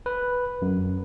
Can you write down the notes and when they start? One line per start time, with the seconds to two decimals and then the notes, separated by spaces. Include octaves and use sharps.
0.06 B4
0.62 F#2